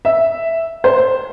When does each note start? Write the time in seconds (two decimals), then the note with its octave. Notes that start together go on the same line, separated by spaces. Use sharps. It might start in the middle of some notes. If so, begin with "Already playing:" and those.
0.05 E5
0.84 C5